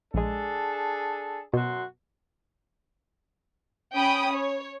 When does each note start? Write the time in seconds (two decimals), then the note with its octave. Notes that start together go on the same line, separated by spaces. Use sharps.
0.14 A#1 G#3 D4 G#4 A4
1.54 F#2 B2 F#4 C6
3.94 C#4 G5 B5 D#6
4.34 C#5